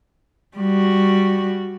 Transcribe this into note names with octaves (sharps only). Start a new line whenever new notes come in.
G3 F#4